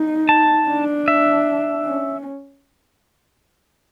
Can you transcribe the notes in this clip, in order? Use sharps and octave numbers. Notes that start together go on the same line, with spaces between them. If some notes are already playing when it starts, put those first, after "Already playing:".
Already playing: D#4
A5
D4
E5
C#4